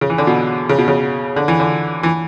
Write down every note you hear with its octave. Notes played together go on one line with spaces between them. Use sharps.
C#3
E3
D3
B2
C#3
B2
C#3
D3
E3
D3
E3